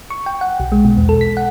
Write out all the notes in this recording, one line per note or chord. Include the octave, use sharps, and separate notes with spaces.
C#6
G5
F#5
B1
G#3
B2
E2
A4
B6
F#5